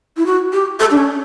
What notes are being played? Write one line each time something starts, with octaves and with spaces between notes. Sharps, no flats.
E4
F#4
G4
A4
D4
C#4